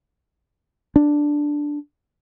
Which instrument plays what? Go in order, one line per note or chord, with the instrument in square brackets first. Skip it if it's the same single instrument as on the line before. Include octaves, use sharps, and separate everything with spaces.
[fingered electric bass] D4